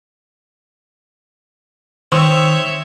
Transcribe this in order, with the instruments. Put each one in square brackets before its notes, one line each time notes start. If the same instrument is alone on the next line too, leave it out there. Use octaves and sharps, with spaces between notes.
[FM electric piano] D#3 [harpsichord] C4 [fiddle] C#5 E5 [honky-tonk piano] C#6 D#6 E6